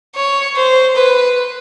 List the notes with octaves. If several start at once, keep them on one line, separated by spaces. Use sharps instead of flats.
C#5
C5
B4